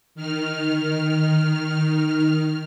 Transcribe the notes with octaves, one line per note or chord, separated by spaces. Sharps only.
D#3 F6